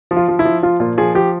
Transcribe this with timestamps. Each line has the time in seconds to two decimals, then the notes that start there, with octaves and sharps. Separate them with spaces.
0.11 F3
0.17 F4
0.28 F3
0.39 E4
0.45 F3
0.63 F3 F4
0.80 A#2 F4
0.97 F3 G#4
1.15 F3 G4